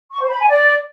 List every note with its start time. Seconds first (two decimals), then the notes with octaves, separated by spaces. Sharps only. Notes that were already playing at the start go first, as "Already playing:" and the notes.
0.12 C#6
0.21 C5
0.30 B5
0.39 G#5
0.49 D5